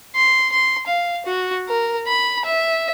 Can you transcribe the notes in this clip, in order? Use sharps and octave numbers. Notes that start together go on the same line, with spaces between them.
C6
C6
F5
F#4
A#4
B5
E5